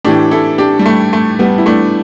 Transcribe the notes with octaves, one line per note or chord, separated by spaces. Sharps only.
A2 E3 D4 G4
E4 A4
D4 G4
G3
A3
A3
G3 B3
E4
A3 D4